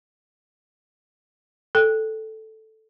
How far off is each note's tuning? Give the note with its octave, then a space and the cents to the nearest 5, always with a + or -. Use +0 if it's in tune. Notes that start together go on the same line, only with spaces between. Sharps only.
A4 +0 G5 +0